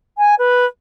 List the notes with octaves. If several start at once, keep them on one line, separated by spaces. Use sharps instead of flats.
G#5
B4